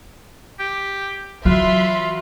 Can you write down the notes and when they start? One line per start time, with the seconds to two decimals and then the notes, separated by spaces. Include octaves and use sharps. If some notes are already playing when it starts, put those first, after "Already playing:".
0.59 G4
1.45 E3 F#3 F4 F#4 E5 B5 C6